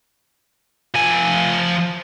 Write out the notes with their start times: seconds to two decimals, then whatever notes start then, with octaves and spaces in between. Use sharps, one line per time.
0.94 F3 G#5